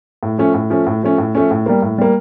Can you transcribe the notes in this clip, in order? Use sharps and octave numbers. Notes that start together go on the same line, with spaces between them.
A2
F3 A3 C#4
A2
F3 A3 C#4
A2
F3 A3 C#4
A2
F3 A3 C#4
A2
G3 A#3
A2
G3 A#3